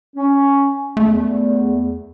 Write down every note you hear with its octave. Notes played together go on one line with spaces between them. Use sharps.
C#4
E2 A3